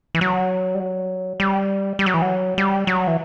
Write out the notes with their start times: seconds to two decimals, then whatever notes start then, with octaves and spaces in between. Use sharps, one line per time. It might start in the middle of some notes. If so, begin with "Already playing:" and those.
0.15 E3
0.21 F#3
0.75 G3
0.80 F#3
1.40 G3
1.99 G3
2.06 F#3
2.14 E3
2.22 F#3
2.58 G3
2.87 F#3
3.07 E3